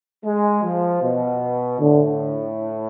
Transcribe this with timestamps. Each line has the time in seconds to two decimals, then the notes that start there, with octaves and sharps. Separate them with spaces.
0.25 G#3
0.63 F3
1.02 B2
1.80 A2 D3